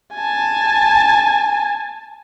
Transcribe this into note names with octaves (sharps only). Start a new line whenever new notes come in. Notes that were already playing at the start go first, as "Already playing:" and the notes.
G#5 A5